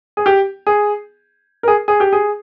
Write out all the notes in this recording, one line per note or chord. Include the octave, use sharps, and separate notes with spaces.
G#4
G4
G#4
A#4
G#4
G#4
G4
G#4